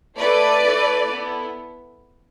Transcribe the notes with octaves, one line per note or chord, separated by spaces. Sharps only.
A3 E4 A4 B4 D5
A3 E4 A4
B3 E4 A4